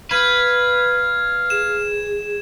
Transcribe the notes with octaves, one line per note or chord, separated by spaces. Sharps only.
B4 F5 G#6
G#4 E7